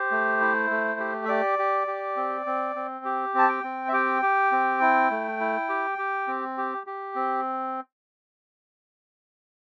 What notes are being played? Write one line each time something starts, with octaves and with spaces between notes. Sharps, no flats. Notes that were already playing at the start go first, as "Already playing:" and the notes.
Already playing: G4 C5
A3
E4
A3
G4
E5
G4 D5
G4
G4
C4
C4
C4
G4
C4 A5
G5
C4
E5
G4 G5
G4
C4
E4
A3
E4
G4
G4
C4
G4
G4
C4